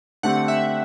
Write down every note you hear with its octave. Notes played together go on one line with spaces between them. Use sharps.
D3 A3 C4 G4 F#5
E5